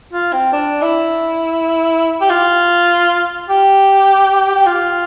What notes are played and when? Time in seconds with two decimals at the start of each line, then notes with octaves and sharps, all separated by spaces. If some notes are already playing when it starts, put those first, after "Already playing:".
0.13 F4
0.33 C4
0.53 D4
0.82 E4
2.21 G4
2.30 F4
3.48 G4
4.55 G4
4.66 F4